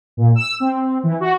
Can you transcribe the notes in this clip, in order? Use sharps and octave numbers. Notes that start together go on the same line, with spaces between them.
A#2
E6
C4
E3
F#4